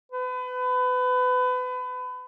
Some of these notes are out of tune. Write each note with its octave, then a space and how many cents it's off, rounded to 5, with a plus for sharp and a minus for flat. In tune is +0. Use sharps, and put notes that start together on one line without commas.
B4 +30